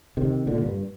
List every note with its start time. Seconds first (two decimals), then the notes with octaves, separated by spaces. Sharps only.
0.17 C3 D#3
0.47 A#2 D3
0.62 G2